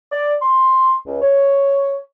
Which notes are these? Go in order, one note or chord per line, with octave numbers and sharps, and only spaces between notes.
D5
C6
C#2
C#5